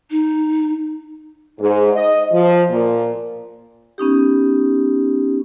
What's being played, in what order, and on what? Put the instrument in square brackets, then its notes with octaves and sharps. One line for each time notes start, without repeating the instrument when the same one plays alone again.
[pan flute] D#4
[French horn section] G#2
D#5
F3
A#2
[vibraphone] B3 C#4 D#4 G4